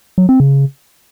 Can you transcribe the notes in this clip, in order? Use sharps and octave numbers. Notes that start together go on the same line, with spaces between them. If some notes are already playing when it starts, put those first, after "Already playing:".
F#3
C4
C#3